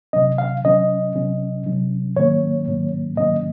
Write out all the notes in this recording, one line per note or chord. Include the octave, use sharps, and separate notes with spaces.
C3 F#3 C#4 D#5
F5
C3 F#3 C#4 D#5
C3 F#3 C#4
C3 F#3 C#4
G#2 D#3 F#3 A#3 C#4 C#5
G#2 D#3 F#3 A#3 C#4
G#2 D#3 F#3 A#3 C#4 D#5